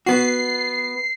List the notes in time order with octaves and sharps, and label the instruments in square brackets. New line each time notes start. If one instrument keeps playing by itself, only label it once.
[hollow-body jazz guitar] B3 F#4 [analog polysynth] C7